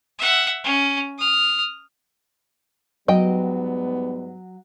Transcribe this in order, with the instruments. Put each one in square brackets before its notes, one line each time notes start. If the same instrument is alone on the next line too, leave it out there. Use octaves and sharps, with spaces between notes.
[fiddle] E5 F#5
C#4
D#6 F6
[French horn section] G#2 G3 B3 [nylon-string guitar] F#3 [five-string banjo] D#5 G5